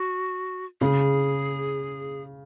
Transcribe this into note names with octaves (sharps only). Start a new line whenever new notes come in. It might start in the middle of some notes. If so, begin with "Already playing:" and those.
Already playing: F#4
C#3 G#4